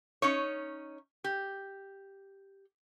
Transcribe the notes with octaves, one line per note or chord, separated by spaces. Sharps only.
C#4 D#4 C#5
G4